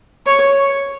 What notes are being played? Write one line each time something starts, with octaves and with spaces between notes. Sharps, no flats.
C#5